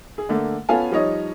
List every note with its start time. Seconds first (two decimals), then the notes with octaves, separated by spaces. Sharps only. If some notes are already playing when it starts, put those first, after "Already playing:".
0.18 G#4
0.29 D3 A3 A#3
0.69 B3 C#4 F4 A4 F5 G#5
0.91 F3 G3 D#4 C#5 D#5